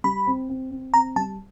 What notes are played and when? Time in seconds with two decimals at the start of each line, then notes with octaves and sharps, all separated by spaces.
0.04 G3 B5
0.27 C4
0.49 C4
0.71 C4
0.94 C4 A#5
1.16 G3 A5